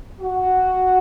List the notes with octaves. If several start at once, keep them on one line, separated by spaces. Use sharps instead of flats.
F#4